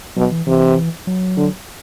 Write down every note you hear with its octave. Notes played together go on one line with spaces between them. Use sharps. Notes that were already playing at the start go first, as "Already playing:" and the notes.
B2 F#3
E3
C3 E3
F#3
D3